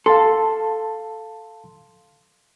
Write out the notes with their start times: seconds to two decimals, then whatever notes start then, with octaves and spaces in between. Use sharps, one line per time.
0.06 A4 F5 A5 C6